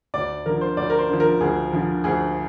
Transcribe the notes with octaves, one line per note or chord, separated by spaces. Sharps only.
D2 D5
D3 F3 A#4
C5
D2 D5
A#4
C5
D3 F3
A#4
D2 G#4
D3 F3
D2 G#4